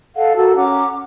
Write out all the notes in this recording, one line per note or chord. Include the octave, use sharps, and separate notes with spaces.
A4 D#5 F5 F#5
F#4 A4 A#4 E6
C#4 F#5 A#5 D6